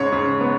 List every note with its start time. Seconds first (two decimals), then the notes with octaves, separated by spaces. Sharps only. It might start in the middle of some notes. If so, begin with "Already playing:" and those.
Already playing: G#2 C#3 C#5 C#6
0.12 C#3
0.41 B3